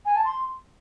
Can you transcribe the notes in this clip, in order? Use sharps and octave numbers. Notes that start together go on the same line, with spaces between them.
G#5
A5
C6